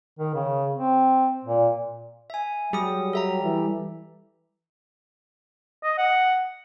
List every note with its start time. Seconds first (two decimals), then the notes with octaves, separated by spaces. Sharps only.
0.19 D#3
0.34 C#3
0.73 C4
1.44 A#2
2.30 E5 G#5
2.73 F#3 G3 G#4 D#6
3.13 A4 E5 A#5
3.43 E3
5.83 D#5
5.98 F#5